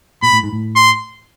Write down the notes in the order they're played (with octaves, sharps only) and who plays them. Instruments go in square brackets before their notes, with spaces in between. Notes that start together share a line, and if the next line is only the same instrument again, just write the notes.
[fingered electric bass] A#2 [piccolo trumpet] B5
[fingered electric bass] A2
G#2
A2
[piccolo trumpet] C6